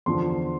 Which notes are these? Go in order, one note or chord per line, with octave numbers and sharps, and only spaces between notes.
E2 D3 F3 C6